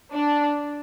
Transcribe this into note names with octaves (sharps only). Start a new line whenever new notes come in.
D4